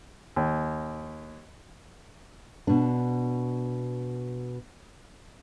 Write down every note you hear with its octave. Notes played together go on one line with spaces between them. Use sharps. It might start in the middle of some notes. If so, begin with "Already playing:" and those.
D#2
B2 D4